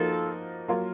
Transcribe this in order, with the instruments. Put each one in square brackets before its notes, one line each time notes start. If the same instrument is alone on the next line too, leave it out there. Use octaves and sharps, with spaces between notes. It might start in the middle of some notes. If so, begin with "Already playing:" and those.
Already playing: [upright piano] F3 A#3 D#4 F#4 A#4 [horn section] F4 A4
[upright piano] F#3 A#3 F4 A#4